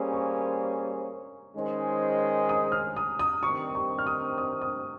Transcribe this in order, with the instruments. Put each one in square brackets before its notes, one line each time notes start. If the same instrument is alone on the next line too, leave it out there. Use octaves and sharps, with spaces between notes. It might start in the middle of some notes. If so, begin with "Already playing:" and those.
Already playing: [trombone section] G3 A#3 C#4 G#4 C5
[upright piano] C#6
[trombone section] D#3 G#3 C#4 G#4 C5
[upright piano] D#6
F6
D#6
D#6
[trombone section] G2 D#3 G3 C4 [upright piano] C#6
[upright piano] C#6
F6
D#6
D#6
D#6